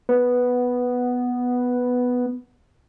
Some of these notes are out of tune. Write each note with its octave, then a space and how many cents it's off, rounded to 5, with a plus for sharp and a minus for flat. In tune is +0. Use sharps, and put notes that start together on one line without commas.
B3 +0